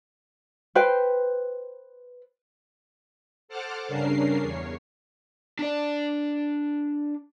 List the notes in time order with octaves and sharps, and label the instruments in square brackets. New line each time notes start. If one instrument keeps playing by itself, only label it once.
[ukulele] B4 C5 G5
[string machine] A4 C5 F#5 A5 D6 F6
G2 C#3 C#4 D4 A#4 C7
E2 C#5
[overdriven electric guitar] D4 D5